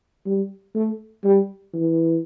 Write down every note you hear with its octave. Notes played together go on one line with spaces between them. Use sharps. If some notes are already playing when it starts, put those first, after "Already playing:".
G3
A3
G3
E3